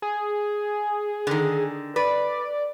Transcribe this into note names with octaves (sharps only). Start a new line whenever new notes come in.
G#4
D3 D#3
B4 D5